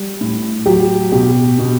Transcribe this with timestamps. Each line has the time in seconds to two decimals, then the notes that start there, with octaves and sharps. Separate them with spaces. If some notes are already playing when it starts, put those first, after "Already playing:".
Already playing: G3
0.21 A2
0.66 F#3 G4
1.12 B2 G4
1.58 B2